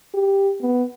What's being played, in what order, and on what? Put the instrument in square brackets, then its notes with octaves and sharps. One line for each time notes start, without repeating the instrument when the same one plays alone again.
[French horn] G4
B3